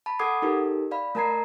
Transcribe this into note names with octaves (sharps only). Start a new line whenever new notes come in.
A5 B5
A4 F#5 D6 D#6 G#6 C7
D#4 G4 A4 A#4
D5 F5 B5
A3 A#4 A5 A#5 G#6 C7